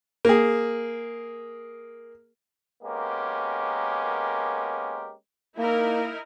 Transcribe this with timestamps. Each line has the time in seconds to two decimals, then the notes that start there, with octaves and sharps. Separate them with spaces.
0.25 A#3 G#4
2.83 G#3 A#3 B3 C#4 G4 A#4
5.58 A#3 D#4 E4 A#4